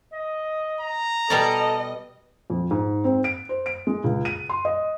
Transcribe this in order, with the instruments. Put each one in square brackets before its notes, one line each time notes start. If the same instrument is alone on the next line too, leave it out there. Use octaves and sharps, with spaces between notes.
[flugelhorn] D#5
[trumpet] A#5
[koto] B2 G3 D5 [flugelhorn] A4 [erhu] D#5
[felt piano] F2
G#2
C4
D7
C5
D7
G#3
C#2
D#7
C6
D#5